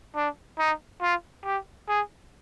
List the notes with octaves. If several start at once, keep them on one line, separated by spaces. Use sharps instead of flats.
D4
D#4
F4
G4
G#4